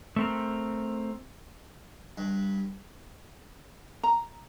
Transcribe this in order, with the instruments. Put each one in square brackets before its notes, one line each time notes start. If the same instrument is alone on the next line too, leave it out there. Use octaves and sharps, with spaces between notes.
[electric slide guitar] A3 C4 A#4
[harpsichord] G2
[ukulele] A#5